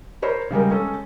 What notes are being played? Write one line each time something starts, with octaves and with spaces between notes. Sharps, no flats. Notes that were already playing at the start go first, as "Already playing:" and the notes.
A#4 C5 C#5 B5
C#3 G3 G#3 A#4
G#3 C#4 A4